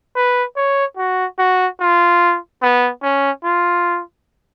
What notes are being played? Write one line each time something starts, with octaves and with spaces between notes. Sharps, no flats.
B4
C#5
F#4
F#4
F4
B3
C#4
F4